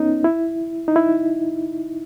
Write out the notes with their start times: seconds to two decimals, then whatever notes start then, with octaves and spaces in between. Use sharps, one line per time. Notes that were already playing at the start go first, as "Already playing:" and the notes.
Already playing: B3 C#4 D#4
0.24 E4
0.88 D#4
0.96 E4